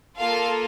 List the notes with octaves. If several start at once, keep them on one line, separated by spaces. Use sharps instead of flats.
A#3 F4 A4 F5